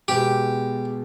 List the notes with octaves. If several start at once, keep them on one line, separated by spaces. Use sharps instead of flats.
B2 G#3 B3 G4